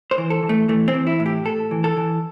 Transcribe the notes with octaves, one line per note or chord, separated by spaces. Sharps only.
C5
E3
A4
E3
A3
E3 A3
C4
E3
E4
A2
G4
A2 A4
E3
A4
E3